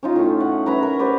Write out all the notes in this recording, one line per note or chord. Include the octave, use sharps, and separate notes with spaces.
C#4 D#4 F4
A2 A4
F#5
C#4 B4 E5 A#5
A#4
G4 B4 C5 D5